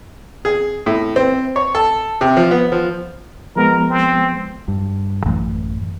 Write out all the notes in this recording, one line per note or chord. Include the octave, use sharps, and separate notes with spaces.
G#4
A2
C4
C#5
A4
C3
F3
B3
F3
F3 G#3 B3 A#4
C4
G2
A1 F#2 E3 A3